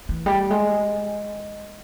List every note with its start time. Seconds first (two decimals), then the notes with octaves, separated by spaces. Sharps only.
0.09 E3
0.26 G3
0.50 G#3